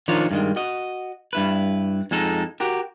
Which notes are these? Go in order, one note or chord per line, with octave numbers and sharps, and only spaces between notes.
D#3 F3 D4 D#4 F4 C#5
G2 D#3 G#3
F#4 D#5
G2 E4 B4
F2 G#3 D#4 A4
F#4 G4 A#4